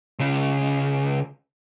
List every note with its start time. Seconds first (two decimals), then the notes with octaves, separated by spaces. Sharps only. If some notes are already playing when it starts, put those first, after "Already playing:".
0.19 C#2 C#3